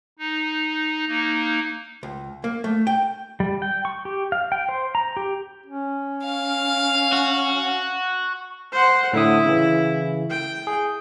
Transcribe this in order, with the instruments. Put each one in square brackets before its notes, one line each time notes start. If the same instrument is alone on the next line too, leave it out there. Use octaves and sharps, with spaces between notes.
[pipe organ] D#4
A#3 D#4
[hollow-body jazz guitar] C#2
A#3
A3
G5
[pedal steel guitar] G3
G5
C#6
G4
F5
G5
C5
A#5
G4
[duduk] C#4
[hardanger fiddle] F5
[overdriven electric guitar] F#4
[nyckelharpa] C5 F#5
[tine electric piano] A2 D3 D#6 [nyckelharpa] E4
[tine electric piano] C#3 E3
[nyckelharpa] G5
[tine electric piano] G#4